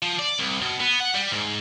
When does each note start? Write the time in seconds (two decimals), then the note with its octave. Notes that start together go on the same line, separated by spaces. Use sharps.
0.03 F3
0.19 D5
0.39 C2
0.61 B2
0.80 B3
1.00 F#5
1.15 G3
1.32 G#2